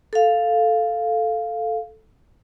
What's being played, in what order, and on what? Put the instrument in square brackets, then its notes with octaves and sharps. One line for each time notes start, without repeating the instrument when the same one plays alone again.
[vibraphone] A4 F5